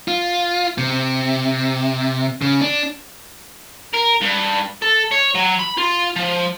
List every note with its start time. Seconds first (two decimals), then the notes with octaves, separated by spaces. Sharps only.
0.08 F4
0.78 C3
2.42 C#3
2.61 D4
3.94 A#4
4.22 G2
4.82 A4
5.11 C#5
5.35 F#3
5.59 B5
5.78 F4
6.16 F3